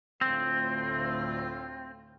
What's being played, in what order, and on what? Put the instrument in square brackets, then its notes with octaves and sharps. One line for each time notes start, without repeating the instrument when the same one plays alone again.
[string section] D2 A2 F4 [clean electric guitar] C4